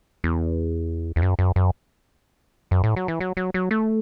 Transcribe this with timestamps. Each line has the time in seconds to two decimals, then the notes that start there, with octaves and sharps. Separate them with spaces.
0.24 E2
1.16 E2
1.22 F#2
1.39 F#2
1.56 F#2
2.71 F#2
2.84 A2
2.96 F#3
3.08 E3
3.20 F#3
3.37 F#3
3.54 F#3
3.71 A3